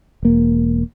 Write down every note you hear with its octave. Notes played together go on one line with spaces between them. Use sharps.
E1 A#3